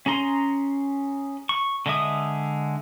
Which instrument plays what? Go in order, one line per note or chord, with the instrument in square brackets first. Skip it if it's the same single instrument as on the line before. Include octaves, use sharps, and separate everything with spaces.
[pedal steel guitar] C#4 G#4 A#5 C6
C#6
D3 G#3 D#5 E5 D#6